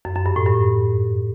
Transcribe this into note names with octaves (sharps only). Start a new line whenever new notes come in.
F#2
F#2
G2
A2
G2